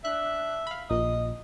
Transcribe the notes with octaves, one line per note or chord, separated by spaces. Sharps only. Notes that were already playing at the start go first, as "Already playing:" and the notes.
D4 E5 F#6
F5 B5
A#1 A#2 D#5